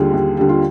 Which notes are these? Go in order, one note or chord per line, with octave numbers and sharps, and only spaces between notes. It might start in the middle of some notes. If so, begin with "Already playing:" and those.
Already playing: D#2 D3 G3 F4 G#4
D#2
D3 G3
F4